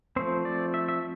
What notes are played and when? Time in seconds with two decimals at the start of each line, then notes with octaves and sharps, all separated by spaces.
0.16 F3 A3 C4 C5
0.45 D5
0.74 E5
0.88 E5